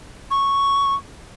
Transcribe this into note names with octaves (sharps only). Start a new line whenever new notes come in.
C#6